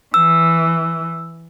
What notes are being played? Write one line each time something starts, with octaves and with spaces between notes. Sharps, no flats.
E3 E6